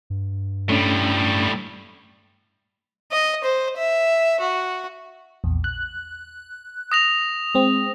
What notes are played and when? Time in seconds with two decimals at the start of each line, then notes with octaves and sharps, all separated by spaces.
0.10 G2
0.70 A2 G3 A3 C#4 D4
3.11 D#5
3.44 C5
3.78 E5
4.40 F#4
5.44 A#1 E2
5.64 F#6
6.92 D#6 A#6 F7
7.55 G#3 C4